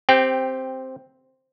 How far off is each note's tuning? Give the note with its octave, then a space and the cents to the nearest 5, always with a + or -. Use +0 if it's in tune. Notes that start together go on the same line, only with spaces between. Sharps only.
C4 +0 G4 +10 G5 -15